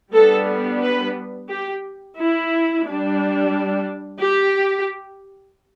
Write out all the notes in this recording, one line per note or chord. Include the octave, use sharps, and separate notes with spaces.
G3 B3 D4 A4
B4
G4
E4
G3 D4
G4